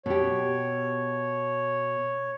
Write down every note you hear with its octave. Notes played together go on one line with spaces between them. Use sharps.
B2 G4 C#5